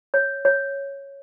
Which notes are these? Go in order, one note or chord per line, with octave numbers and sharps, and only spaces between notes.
C#5
C#5